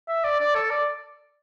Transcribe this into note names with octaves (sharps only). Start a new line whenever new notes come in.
E5
D5
D5
A4
D5